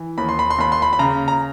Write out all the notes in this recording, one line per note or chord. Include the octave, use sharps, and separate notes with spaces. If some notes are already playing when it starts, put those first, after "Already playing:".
Already playing: E3
D#2 B5
C6
B5
C6
D#2 B5
C6
B5
B5
C#3 A#5
A#5